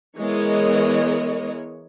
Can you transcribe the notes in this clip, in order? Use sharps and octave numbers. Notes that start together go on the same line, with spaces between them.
E3 G#3 B3 A#4 C#5 D#5